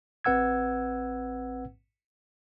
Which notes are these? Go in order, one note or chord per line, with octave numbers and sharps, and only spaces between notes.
A1 C4 B4 F#5 E6 G#6